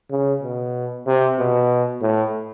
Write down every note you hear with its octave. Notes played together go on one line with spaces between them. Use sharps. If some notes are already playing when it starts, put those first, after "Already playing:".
C#3
B2
C3
B2
A2